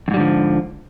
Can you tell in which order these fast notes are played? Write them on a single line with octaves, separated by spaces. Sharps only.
F2 G#2 G3 D3 F3